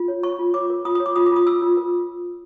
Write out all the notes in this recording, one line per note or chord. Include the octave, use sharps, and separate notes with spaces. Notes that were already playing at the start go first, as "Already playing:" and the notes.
Already playing: F4
C#5
C#5 C#6
F4
C#5 D6
A#4
F4 D#6
C#5 D#6
D6
F4 D#6
D6
F4 D#6
F4 E6
F4
A#4